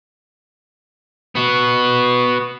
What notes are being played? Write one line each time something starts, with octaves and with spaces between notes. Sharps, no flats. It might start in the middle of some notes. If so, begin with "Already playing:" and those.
B3 F#4